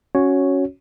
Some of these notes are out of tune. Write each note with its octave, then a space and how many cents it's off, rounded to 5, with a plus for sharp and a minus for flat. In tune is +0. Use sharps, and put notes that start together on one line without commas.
C#4 -5 F#4 -5 C#5 +0